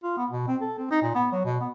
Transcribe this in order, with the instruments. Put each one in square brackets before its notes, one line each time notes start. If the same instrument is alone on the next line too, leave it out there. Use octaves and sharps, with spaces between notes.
[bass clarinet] F4
B3
B2
C4
A4
C4
D#4
A#2
B3
F#3
B2
B3